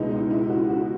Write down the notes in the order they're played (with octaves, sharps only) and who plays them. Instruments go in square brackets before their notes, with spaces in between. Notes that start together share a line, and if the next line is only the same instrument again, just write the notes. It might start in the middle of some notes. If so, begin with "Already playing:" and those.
Already playing: [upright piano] C#2 B2 G#3 B3 D#4 E4
D#4
E4
F#4
F#4